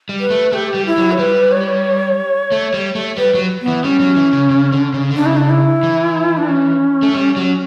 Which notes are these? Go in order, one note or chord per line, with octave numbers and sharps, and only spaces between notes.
G3
B4
A3
A3 G4
G3
E4
F#3
C#5
G3 B4
C#5
A3
G3
A3
G3 B4
F#3
B3
E3
G3 C#4
F#3
E3
C#3
C#3
D3
C#3
D3
C#3 D4
E4
D4
E4
E3
D4
C#4
A3
G3
F#3